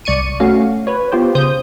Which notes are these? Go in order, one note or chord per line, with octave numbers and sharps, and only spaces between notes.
C2 D5 C#6 C#7 D#7
A3 C#4 F#4 F5
B4 C#5
B3 F4 G4 C5
C#3 C5 D#6 G6